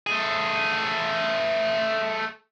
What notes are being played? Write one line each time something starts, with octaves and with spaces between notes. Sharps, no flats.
A3 G#4